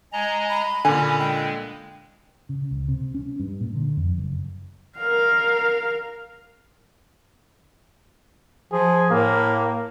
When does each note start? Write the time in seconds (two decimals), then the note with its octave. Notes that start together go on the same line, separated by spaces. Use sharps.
0.13 G#3 D#5 G#5 A#5
0.49 B5
0.85 A#2 D3 C#4 G#5
1.19 G#3 G5
2.49 C#3
2.71 C#2
2.88 C3
3.15 C#4
3.39 G2
3.61 A#2
3.75 D3
3.97 F2
4.18 F#1
4.98 A#4 F5
8.72 F3 G#4
9.10 A2 A#3